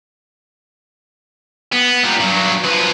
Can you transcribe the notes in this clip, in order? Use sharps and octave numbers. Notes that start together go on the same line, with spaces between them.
B3
A#2 G3
G2 F#3
F3 B4